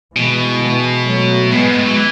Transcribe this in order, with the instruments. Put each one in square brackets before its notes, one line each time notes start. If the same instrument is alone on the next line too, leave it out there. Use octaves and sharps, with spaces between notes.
[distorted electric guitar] B2 [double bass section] E3 G#3
[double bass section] E3 G#3
F#3 A3
[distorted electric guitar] A2 [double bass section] G#3 B3
[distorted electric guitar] G#2
A2
F#3
E3